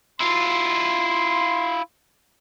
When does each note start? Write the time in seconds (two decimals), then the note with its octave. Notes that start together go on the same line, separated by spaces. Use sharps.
0.20 E4 F4 C6